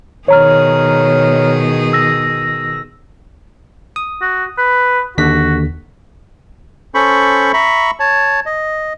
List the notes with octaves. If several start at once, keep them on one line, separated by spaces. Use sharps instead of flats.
B2 D#3 G#4 C#5 A#5 F6
E6 A#6
D#6
F#4
B4
D#2 D3 F#4 B6
C#4 A4 C5 B5 C#6
E5 A#5 B5 C#6
C#5 A5
D#5